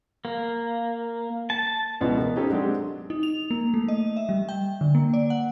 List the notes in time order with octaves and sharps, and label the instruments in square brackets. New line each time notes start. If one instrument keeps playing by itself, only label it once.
[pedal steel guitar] A#3
A5
[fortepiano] C#2 B2 E3
A#4
C#4 D#4 G4 A4 C5
F#3 G#3 C4 D4 G4
[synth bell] D#4
F7
A#3
A3
D#5
E5
G3
G5
D3
A#3
D5
F#5